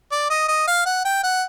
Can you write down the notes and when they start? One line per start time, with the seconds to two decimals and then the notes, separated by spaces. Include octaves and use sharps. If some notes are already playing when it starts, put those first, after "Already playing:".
0.12 D5
0.30 D#5
0.48 D#5
0.67 F5
0.86 F#5
1.05 G5
1.23 F#5